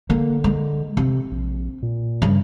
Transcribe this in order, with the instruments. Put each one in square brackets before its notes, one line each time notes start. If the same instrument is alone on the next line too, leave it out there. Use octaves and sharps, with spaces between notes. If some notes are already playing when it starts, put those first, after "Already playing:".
[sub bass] D3 [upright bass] A#3
[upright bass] G#3
[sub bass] C3 [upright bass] C4
[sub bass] A#1
A#2
[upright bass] G2 C#3